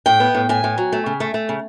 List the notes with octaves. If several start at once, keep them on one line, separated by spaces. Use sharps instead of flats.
A2 G5
B3
A2
A2 G#5
A2
F#3
A3
C#3
A3
A3
C#3